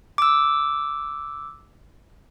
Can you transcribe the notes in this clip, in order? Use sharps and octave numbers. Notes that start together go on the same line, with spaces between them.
D6 E6